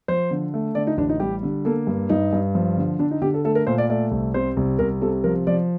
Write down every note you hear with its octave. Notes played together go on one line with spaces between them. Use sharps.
F3 C5
D3
A3
D3 D5
D#4
A1 D4
D#4
G3 G4
D3
A#3 A4
G2
G2 D#4
G2
F3
D3
D3 D4
D#4
D3 G4
A4
A3 A4
A#4
A#2 C5
D5
A3 D5
C2
C3 C5
C2
C2 A#4
C3 A4
F3 A#4
F3 D5